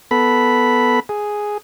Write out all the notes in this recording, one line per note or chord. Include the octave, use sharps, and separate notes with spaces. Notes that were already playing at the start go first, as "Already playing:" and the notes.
B3 A4 B5
G#4